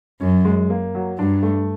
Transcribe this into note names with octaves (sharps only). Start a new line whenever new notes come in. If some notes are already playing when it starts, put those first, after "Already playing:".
F#2 C#4
G#3
A#3
F#3
G2 D4
A3